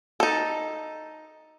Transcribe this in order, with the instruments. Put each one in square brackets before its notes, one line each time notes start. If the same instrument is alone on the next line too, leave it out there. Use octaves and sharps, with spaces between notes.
[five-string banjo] D#4 A4